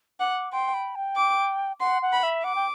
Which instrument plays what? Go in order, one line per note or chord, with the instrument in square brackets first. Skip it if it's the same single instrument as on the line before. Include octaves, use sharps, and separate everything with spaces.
[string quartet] F#5 [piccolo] D6
[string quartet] G5 [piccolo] C6
[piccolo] B5
G5
[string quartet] D6
[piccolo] F#5 [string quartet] C6
[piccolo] F#5
[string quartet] B5
[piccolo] E5
[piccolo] F#5 [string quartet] D6
[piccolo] G5